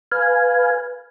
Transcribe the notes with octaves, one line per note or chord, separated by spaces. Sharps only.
B4 F5 G#5